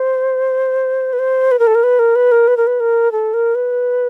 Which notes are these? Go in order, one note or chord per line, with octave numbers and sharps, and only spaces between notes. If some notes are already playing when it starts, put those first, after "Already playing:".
Already playing: C5
B4
C5
B4
A#4
A4
A#4
B4
A#4
B4
A#4
B4
A#4
B4
A#4
A4
A#4
B4